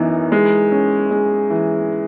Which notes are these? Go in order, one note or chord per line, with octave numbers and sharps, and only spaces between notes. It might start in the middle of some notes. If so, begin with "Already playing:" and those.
Already playing: F#2 E3 B3 D#4
G#3
C#4
G#3
E3